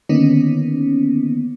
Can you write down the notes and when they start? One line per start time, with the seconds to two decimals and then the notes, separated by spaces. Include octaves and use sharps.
0.09 D3 D#3 A#3 B3 C#4 D#4